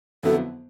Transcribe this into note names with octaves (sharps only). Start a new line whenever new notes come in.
F2 D3 F#3 B3 E4 A4